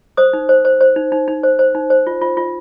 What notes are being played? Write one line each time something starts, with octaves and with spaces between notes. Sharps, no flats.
C5 D#6
D#4
C5
C5
C5
D#4
D#4
D#4
C5
C5
D#4
C5
F4
F4
F4